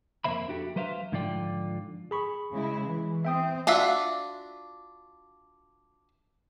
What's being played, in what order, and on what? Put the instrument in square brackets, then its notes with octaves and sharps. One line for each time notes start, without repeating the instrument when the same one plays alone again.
[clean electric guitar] F2 A#3 C5 E5 B5
D4 F#4 G4 A4
F#3 B4 C5 E5 F5
G#2 D3 F3 F4 D5 G5
[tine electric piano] G#4 B5 C#6
[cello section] C#3 G#3 E4
E3
[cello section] C4 C5 [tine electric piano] E5 G5 D#6
[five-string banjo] D4 F4 F#4 E5